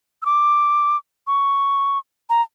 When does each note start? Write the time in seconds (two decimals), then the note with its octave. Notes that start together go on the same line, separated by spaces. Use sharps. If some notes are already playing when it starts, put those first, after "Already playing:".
0.22 E6
0.25 D6
1.27 C#6
2.30 A#5